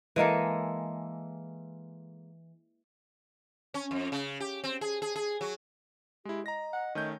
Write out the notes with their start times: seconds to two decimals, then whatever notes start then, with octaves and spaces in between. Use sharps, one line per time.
0.16 E3 G#3 A#3 A4
3.74 C#4
3.91 F2
4.12 C#3
4.40 G4
4.64 C4
4.81 G#4
5.02 G#4
5.16 G#4
5.41 F#3
6.25 G#3 E4 G4
6.46 D#5 A#5 A#6
6.73 F#5
6.95 D#3 A3 C#4 G6